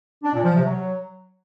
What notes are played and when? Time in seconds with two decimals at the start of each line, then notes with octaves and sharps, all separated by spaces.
0.24 D4
0.34 A#2
0.44 F3
0.55 C3
0.65 F#3